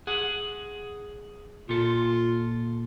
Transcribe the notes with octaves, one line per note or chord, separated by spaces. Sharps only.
G#4 F#5
A#2 F4 A4